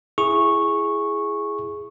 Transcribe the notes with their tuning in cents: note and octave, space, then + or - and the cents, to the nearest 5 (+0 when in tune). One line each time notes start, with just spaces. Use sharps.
E4 +20 G#4 +0 C#6 -10